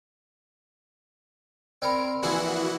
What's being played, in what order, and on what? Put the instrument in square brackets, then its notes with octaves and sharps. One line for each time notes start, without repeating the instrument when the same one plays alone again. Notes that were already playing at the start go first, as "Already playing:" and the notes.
[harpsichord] C4 A#4 [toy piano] D5 G5 B5
[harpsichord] A#1 E3 G#4 [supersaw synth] E4 F#4 F#5